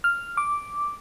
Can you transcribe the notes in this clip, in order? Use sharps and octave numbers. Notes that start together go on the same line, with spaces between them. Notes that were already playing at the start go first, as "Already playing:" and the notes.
F6
D6